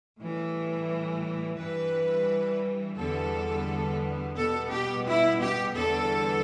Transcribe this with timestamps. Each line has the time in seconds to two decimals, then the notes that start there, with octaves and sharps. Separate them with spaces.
0.18 A2 E3 G3
1.58 G2 E3 G3 B4
2.96 E2 D3 G3 B3 A4
4.36 B2 G3 B3 A4
4.71 G4
5.06 E4
5.40 G4
5.74 E2 D3 G3 B3 A4